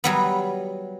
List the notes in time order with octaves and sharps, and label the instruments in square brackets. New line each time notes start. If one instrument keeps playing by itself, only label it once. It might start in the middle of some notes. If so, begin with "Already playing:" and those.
[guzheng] F#3 G3 B3